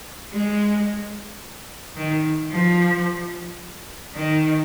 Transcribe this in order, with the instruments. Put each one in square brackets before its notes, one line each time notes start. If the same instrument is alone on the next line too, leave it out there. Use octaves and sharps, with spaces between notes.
[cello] G#3
D#3
F3
D#3